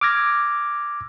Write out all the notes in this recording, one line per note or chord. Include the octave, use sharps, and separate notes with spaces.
D6 E6 F6 G#6 A#6